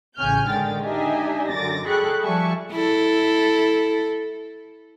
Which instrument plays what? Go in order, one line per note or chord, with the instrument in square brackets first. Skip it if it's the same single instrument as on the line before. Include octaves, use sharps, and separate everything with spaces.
[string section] A1 C#3 C#4 G#5 F6 G6
D3 D#3 G#3 G5 A6
D4 D#4 G4 D#5 E5 G#5
F#2 D3 D6 A6 A#6
G#4 A4 G5 B5 C#6 F#6
F3 G3 E5 G#5 A5 C#6
[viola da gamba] E4 A4